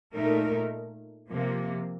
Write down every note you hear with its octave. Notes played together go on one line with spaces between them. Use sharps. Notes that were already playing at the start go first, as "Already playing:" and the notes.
A#2 A3 D#4 A#4
C3 F3 A#3